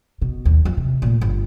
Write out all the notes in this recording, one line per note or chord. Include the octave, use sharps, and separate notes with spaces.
B2
D#2
F2
C3
A#2 A3
G1